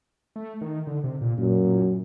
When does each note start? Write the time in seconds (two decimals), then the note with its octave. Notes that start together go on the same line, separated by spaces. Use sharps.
0.36 A3
0.61 D#3
0.87 D3
1.04 C3
1.21 A#2
1.38 F#2 A#2
1.64 A#2